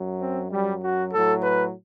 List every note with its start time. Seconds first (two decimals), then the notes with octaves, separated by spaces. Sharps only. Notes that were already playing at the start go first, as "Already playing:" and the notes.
Already playing: F#2 F#3
0.21 C4
0.51 F#2 F#3 G3
0.83 F#4
1.12 A2 F#3 A4
1.43 B4